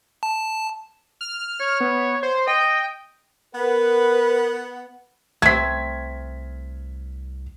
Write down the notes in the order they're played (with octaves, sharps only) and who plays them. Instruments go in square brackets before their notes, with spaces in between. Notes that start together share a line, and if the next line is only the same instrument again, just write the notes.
[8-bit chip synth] A5
[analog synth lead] F6
[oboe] C#5
[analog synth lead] B3
C5
[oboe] D#5 [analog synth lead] G5
[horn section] B3 F#5 [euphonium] A#4 [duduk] B4
[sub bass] C2 [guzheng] A3 C4 [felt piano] G#6 B6